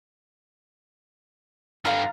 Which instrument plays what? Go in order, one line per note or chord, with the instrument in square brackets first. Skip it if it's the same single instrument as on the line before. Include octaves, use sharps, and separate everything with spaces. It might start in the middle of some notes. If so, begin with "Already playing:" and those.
[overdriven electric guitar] G2 D3 [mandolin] F5 A#5 F6